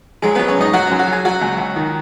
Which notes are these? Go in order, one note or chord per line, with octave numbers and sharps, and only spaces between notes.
F#3 G#3 G#4
F#3 B3 B4
C#4 C#5
G#2 D#4 D#5
F#3 F#4 F#5
F#2 C#4 C#5
F#4 F#5
F#3 G#4 G#5
F#3 F#4 F#5
C#2
C#2
D#3